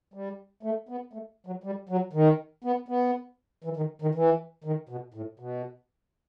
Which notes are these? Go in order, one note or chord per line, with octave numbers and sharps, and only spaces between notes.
G3
A3
B3
A3
F#3
G3
F#3
D#3
B3
B3
E3
D#3
D#3
E3
D#3
B2
A2
B2